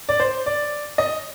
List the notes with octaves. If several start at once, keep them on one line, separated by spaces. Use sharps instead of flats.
D5
C5
D5
D#5